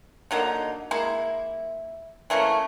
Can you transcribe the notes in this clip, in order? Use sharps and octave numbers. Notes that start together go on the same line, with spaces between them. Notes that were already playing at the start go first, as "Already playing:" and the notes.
D3 F#3 A#3 D#4
G#3 A#3 E4
E3 A3 A#3 C#4